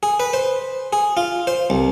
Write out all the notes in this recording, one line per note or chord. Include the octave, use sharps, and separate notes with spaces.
G#4
B4
C5
G#4
F4
C5
C2